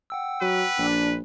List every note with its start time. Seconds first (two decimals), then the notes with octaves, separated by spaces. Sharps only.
0.10 F#5 G5 E6
0.41 F#3 B4
0.79 A#1 D4